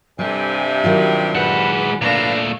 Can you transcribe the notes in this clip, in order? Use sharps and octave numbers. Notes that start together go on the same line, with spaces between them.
G2 C3 G3 G4 A4 C5 G#5
D#3 F#3 F4 G5
G#3 B4 F#5 B5
A#2 A3 D4 B4 F5 A#5